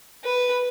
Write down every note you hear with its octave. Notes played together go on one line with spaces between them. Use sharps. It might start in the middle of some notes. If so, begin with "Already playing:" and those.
B4